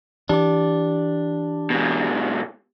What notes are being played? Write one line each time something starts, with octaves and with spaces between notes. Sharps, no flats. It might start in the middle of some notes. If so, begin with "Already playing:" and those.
E3 D4 G4 D6
G#2 B2